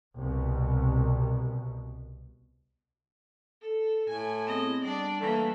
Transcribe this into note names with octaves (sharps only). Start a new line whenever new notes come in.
C2 B2
A4
A2 G#5
B3 C4 G#4 D#5
G3 D4 D5
E3 A3 A#3